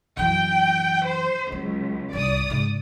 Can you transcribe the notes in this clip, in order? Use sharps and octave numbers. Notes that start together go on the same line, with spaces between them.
F#2 E3 G5
C5
C#2 F#3
C2 G2 D5 D#6
G#2 C#3